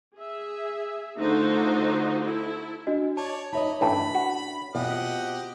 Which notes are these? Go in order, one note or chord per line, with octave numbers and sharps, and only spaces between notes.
G#4 E5
D3 A3 D#4 F4 F#4 C5
E4 A4
D4 F#4 D#5
C#5 D5 A5
D#4 C#5 D#5 E5 A5 B5
G2 E3 A3 C#4 D4 B5
F#4
E2 B2 C4 F4 G4 D#5 F#5